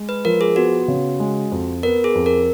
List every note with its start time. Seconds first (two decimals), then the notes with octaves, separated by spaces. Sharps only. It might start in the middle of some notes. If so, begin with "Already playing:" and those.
Already playing: G#3
0.09 B4
0.25 F3 A#4
0.41 G#4
0.56 B3 F#4
0.88 C#3
1.20 G#3
1.52 F2
1.83 B3 A#4
2.04 G#4
2.15 F2
2.26 A#4